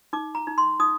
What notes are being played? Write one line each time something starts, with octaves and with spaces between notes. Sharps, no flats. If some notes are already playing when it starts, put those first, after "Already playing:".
D#4 D6
A#5
D#4
C6
D#4 D#6